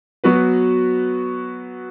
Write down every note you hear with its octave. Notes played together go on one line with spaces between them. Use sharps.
F#3 B3 F#4 B4